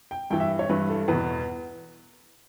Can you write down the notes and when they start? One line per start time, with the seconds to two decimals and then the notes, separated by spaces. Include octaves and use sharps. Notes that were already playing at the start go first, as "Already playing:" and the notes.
0.11 G5
0.30 G2 E3 G5
0.40 E5
0.59 C#5
0.69 G2 E3 B4
0.90 A4
1.08 E2 B2 B4